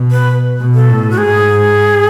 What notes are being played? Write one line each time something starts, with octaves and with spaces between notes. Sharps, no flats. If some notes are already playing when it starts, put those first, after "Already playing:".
Already playing: B2
B4
B2
A4
A2
F#4
G#2 G#4